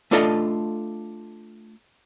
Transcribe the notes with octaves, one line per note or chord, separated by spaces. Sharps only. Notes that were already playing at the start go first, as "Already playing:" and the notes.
A3 D4 F4 A4 D#5 A5